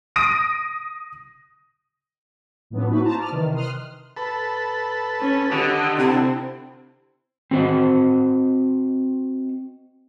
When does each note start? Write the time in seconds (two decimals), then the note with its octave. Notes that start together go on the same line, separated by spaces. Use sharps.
0.16 D#6 A#6 D7 D#7
2.70 A2 F3 F#3 B3 C#4 D4
2.90 A#3 C4 D#4 E4 F#4 B4
3.04 C5 A5 A#5
3.18 D5 D#6 F6
3.32 C3 D#3 E3
3.54 C6 D#6 F6 F#6
4.17 A4 B4
5.20 C#4
5.52 D3 G4 D#5
5.99 C3 C4 E4
7.51 C4 F#4 C5 D#5